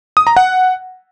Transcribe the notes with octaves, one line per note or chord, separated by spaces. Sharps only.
D#6
A#5
F#5